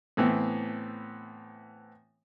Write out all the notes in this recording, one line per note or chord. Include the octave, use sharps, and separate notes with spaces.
A2 E3 B3 C4